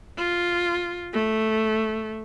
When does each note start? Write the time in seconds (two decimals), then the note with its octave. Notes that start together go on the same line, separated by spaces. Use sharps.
0.17 F4
1.13 A3